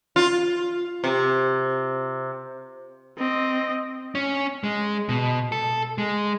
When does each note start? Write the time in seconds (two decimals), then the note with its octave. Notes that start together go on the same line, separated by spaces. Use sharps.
0.16 F4
1.04 C3
3.18 C4 D#5
4.15 C#4
4.64 G#3
5.09 B2
5.52 A4
5.98 G#3